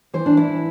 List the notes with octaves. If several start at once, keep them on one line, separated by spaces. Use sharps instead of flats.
E3 C5
D4
E3 E4